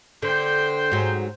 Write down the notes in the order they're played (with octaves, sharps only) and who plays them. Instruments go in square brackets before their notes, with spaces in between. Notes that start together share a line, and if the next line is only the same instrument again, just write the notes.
[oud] D3 [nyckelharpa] C5 G5
[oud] G#2 F#3